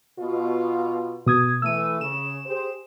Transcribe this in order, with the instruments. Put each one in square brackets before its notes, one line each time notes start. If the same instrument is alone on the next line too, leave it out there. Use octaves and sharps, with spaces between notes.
[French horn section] B2 F4
[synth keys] B2 D#6 G#6
[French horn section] E3 A3 [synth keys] E6 D#7
[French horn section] C#3 [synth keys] E7
[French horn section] G4 G#4 C5